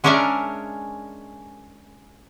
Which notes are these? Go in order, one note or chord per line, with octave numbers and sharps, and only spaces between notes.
G#3 C#4 D4 A#4 D5 E5